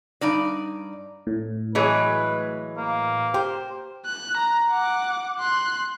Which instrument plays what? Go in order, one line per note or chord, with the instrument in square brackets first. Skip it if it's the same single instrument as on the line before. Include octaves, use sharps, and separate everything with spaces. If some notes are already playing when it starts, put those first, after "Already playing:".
[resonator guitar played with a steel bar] G2 D#4 D5
[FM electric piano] A2
[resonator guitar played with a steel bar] E3 F#3 G#3 [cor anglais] B4
[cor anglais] A#3
[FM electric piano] G4 [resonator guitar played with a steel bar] C5
[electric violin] F#6
A#5
F#5 D6
C6 F#6